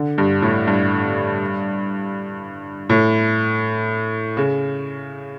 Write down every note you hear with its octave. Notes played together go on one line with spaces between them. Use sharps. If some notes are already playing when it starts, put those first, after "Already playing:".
Already playing: D3
G2
A2
G2
A2
C#3